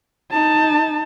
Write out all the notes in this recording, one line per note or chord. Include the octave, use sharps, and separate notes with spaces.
D#4 A5